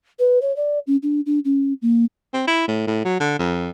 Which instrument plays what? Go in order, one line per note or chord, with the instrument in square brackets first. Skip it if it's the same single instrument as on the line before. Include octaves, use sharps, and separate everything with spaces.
[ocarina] B4
C#5
D5
C#4
D4
D4
C#4
A#3
[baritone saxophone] C4
E4
A2
A2
F#3
D3
F2